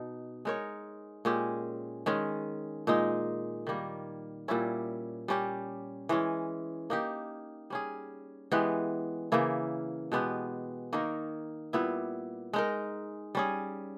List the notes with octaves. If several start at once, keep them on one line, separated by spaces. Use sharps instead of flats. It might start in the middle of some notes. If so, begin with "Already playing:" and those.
Already playing: B2 D#4
G#3 D#4 A#4 C#5
A#2 G#3 C#4 G4
D#3 G#3 C#4
A#2 G#3 D#4
D#3 G3 A#3
A#2 G3 C#4 E4
G3 C#4 G4
E3 G#3 C#4
A#3 D#4 G4
G3 C#4 G#4
E3 G#3 B3 G4
C#3 E3 A#3 E4
B2 G#3 B3 G4
D#3 A#3 D#4 A#4
A#2 G3 B3 E4
G#3 D#4 A#4
G3 C#4 G#4